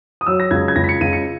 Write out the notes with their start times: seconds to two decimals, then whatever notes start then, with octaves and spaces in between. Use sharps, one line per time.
0.21 D#6
0.26 F#3 E6
0.40 A#6
0.51 C#2 G#6
0.68 G#6
0.76 C#2 A#6
0.84 B6
0.89 C#7
1.01 C#2 D#7
1.13 C#7